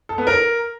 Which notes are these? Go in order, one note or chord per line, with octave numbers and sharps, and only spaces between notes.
A4
B3
A#4